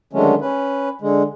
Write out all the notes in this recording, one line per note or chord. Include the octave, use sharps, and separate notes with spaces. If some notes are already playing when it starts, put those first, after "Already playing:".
D3 D#3 F#3 G#3 A3 C#4
C#4 B4
D3 G#3